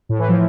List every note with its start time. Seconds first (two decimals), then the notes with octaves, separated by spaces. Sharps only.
0.09 A2
0.19 E3
0.29 F3